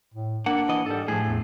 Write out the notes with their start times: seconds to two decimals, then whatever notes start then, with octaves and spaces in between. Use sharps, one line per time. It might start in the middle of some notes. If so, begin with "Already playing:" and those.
0.14 A2
0.46 A#3 D4 F#5
0.69 E3 D#5
0.86 G#2 G3 A4
1.08 A2 F3 G#4
1.27 E2